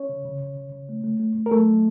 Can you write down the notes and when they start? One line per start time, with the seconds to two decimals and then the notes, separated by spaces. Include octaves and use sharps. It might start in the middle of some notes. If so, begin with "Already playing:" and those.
Already playing: C#4 C#5
0.09 C#3
0.25 C#3
0.41 C#3
0.57 C#3
0.72 C#3
0.89 A3
1.04 A3
1.20 A3
1.35 A3
1.46 A#4
1.51 F#3 A3 A4
1.68 F#3